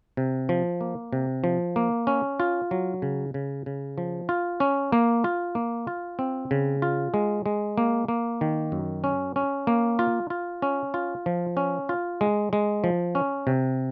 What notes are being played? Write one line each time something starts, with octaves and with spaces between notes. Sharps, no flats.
C3
F3
A#3
C3
F3
A#3
C#4
F4
F#3
C#3
C#3
C#3
F3
F4
C#4
A#3
F4
A#3
F4
C4
C#3
F4
G#3
G#3
A#3
A#3
D#3
F#2
C#4
C#4
A#3
F4
F4
C#4
F4
F3
C#4
F4
G#3
G#3
F3
C#4
C3